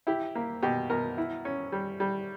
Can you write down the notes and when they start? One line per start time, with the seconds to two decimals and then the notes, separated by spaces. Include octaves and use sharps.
0.07 E4 G4
0.35 A#3
0.62 B2 G4
0.90 B2 A#4
1.18 E4
1.45 C#4
1.72 G3
2.00 G3